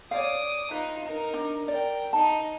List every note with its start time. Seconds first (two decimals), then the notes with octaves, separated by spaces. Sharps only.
0.11 C#5 D5 F5 D6 D#6
0.71 D#4 F4 B4
1.05 D#4 A#4
1.34 D4
1.68 A#4 D5 G5
2.13 D#4 A5